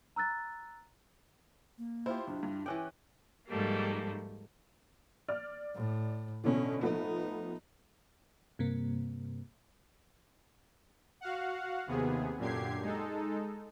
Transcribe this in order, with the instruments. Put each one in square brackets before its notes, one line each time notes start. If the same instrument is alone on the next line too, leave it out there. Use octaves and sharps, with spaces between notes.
[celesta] A#5 E6 F#6 A6
[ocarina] A#3
[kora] E4 F4 G4 [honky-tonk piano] C5
[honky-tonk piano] B1 [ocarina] D4
[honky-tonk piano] G2
[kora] E3 C#4 G5 [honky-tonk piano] D6 F#6
[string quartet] G#2 F3 G3 A3 A#3
[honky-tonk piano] D5 F6
[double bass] A2
[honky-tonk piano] B2 D3 E3 [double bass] C#4
[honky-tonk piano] F3 A3 B3 [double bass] D#4
[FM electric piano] G2 C3 A#3
[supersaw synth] F#4 F5 F#5
D#2 C3 B3 G#4
F#2 A#2 D3 G4 G#6 C7
G#3 D#4 A4